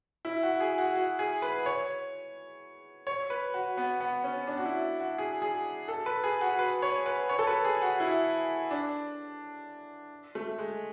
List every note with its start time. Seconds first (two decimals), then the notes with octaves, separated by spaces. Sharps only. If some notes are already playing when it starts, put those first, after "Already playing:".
0.25 E4
0.43 F#4
0.60 G#4
0.78 F#4
0.96 F#4
1.19 G#4
1.42 B4
1.66 C#5
3.07 C#5
3.30 B4
3.54 F#4
3.77 B3
4.00 B3
4.24 C#4
4.47 D4
4.57 F#4
4.65 E4
5.00 F#4
5.18 G#4
5.42 G#4
5.88 A4
6.06 B4
6.24 G#4
6.41 F#4
6.59 B4
6.82 C#5
7.06 B4
7.29 C#5
7.39 A4
7.47 B4
7.65 G#4
7.82 F#4
8.00 E4
8.71 D4
10.35 A3
10.59 G#3